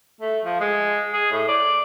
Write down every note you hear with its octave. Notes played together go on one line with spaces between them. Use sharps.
A3
F3
G#3
G#4
A2
D5